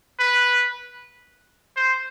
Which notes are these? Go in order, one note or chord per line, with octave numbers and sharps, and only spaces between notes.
B4
C5